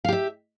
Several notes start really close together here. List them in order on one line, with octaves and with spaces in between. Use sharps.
F5 G4 E5